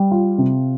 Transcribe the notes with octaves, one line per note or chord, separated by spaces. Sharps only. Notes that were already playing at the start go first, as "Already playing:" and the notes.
Already playing: G3
F4
C3